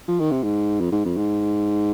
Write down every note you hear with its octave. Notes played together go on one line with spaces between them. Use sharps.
F3
D#3
C3
G#2
F2
G#2
F2
G#2